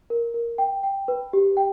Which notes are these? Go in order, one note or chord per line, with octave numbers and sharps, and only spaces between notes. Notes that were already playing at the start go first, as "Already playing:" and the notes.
A#4
A#4
G5
G5
B4
G4
G5